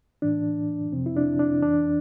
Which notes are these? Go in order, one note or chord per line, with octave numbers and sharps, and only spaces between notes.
A2 E3 D4
F2 C3 F3 C4
E4
D4
D4
F2 E3 D4